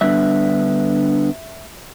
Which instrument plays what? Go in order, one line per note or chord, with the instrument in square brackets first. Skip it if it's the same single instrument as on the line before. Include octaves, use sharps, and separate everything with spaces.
[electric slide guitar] D3 G3 B3 D4 E5